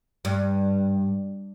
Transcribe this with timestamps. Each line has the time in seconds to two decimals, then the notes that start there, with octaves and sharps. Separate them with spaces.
0.25 G2